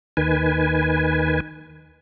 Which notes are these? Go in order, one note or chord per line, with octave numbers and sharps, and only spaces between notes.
D#2 D#3 B4 G#5